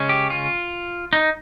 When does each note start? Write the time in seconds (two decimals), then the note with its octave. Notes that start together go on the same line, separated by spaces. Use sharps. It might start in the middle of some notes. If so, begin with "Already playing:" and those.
Already playing: C#3 G#3 C#4
0.09 G4
0.30 F4
1.13 D#4